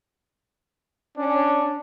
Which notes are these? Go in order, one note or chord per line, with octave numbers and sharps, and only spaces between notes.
C#4 D4